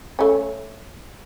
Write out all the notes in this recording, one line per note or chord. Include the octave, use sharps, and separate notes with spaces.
A3 C#4